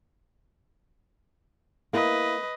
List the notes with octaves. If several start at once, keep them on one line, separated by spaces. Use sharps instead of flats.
A#3 E4 B4 D#5